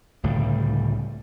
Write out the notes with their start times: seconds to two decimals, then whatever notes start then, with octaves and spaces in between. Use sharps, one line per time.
0.23 C#2 A2 D3 G3